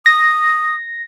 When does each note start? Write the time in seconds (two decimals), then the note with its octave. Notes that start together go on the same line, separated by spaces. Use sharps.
0.06 D#6 A#6